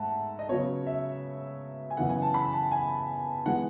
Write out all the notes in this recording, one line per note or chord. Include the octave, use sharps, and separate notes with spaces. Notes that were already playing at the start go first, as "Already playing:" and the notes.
Already playing: G#2 A3 E5 F#5 A5
D#5
C#3 F#3 B3 C#5
E5
G#5
F#2 C#3 E3 B3 F#5
G#5
A5
B5
A5
G#5
E3 G#3 B3 F#5